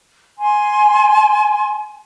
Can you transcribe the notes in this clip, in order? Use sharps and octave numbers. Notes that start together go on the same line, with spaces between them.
G#5 C6